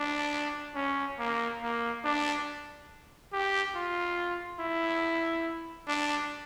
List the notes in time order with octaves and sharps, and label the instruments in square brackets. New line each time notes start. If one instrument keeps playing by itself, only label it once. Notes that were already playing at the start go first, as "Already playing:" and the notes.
Already playing: [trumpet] D4
C#4
A#3
A#3
D4
G4
F4
E4
D4